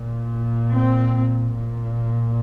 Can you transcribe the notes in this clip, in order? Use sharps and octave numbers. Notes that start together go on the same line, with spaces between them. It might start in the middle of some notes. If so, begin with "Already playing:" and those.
Already playing: A#2
C4
A#2